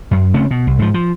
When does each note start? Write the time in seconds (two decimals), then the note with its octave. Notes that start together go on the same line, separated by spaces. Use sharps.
0.11 F#2
0.34 C#3 A3 C4 C#4
0.51 B2
0.67 C2
0.79 G#2 F3
0.94 F3